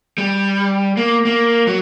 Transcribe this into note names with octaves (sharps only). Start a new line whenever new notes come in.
G3
A#3
A#3
F#3